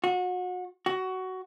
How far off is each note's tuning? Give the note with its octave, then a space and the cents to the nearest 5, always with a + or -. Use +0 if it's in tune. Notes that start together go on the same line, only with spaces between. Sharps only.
F#4 -30
F#4 +15